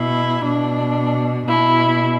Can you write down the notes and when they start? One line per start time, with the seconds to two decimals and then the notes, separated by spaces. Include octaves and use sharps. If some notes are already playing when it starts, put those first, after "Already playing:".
Already playing: B2 E4
0.45 B2 D4
1.47 B2 E4